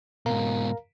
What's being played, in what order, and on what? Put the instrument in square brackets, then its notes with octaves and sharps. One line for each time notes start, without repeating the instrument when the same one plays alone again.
[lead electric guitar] G#2 B2 [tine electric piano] A#4 F5 A#5